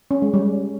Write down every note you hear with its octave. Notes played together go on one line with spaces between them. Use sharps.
C#4
G#3
G3